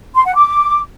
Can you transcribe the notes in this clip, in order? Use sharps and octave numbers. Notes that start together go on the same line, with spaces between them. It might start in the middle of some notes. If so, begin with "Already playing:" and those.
C6
F#5
D6